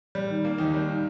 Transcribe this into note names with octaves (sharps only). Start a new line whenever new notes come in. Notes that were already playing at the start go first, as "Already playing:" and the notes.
G3
D#3
A#3
D#2 D#4
G3
D#3